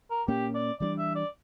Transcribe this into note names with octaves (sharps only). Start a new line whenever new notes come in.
A#4
A#2 A#3 C#4 G4
D5
E3 G3 B3 D4 D5
E5
D5